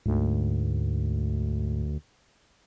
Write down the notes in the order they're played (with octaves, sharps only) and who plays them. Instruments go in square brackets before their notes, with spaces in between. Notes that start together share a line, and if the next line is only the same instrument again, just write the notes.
[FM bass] D2 [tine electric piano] G#2